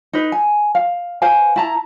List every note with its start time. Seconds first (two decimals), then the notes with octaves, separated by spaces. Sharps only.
0.13 D#4 B4
0.32 G#5
0.75 F5
1.22 B4 C5 F5 G#5
1.56 E4 A5 A#5